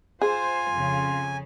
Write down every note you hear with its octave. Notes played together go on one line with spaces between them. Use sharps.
F4 G#4 C5 G#5
F2 C#3